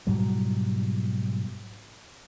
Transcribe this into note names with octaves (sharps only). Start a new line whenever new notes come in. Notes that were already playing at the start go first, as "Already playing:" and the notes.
G#2 B2 F#3 G3